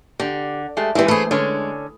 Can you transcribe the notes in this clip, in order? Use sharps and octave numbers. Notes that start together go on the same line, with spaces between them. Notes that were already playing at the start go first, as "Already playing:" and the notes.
D3 G4
G#3 A3 G4
E3 G#3 E4 G4
E3 A3 G#4 C5
D3 G#3 C#4 C#5